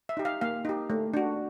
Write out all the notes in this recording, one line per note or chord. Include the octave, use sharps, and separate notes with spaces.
E5
D#4 G4
F5
A#3 F5
D#4 G4
A3
D4 F#4